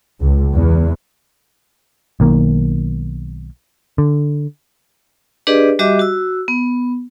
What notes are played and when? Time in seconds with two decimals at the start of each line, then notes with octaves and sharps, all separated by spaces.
0.21 C#2
0.54 E2
2.20 B1 D#3 A#3
3.98 D3
5.47 D4 G4 G#4 B4 D5 D#5
5.79 G3 F#4 G4 D#5 E5 D6
5.99 F#4 E6
6.48 B3